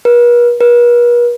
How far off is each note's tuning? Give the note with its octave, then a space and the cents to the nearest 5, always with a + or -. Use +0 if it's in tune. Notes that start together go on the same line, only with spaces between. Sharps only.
B4 -45
B4 -45